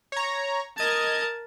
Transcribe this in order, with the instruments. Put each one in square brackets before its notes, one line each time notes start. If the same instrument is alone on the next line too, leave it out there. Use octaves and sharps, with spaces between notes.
[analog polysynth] C#5 A#5
[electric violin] A#4 A5 [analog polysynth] D#5 G#6